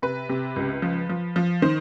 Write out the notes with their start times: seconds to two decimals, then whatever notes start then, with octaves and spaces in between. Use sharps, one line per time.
0.02 C3 B4
0.29 C3
0.56 C#2
0.82 F3
1.09 F3
1.36 F3
1.62 D#3 C5